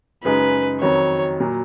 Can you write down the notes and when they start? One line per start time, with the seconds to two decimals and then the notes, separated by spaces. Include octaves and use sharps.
0.24 F#2 C#3 G#3 D#4 B4
0.81 F2 D#3 F#3 C#5
1.40 A#2 F#3